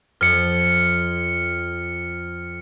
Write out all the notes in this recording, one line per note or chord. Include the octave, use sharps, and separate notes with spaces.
F2 F6 C#7